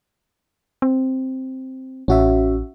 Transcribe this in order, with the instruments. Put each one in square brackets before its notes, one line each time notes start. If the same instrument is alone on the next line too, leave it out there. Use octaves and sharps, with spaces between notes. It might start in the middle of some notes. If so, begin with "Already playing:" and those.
[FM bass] C4
[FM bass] A1 [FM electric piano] C#4 F#4 E5